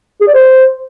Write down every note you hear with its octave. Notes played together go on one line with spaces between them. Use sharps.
G#4
D5
C5